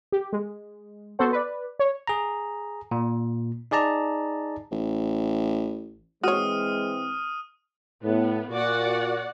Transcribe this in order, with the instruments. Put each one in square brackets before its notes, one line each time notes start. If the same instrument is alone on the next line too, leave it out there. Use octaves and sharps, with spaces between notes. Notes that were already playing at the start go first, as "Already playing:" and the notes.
[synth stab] G4
G#3
B3 F#4 A4 C5 F#5
B4 D5
C#5
[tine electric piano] G#4 A#5
A#2
D#4 G#4 D5 A5 A#5
[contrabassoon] A1
[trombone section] E3 C4 [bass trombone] G#3 [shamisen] F#4 C#5 [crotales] D#6 F6 D#7
[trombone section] A2 [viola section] B3
[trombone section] A#2 [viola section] F#4 D5 F#5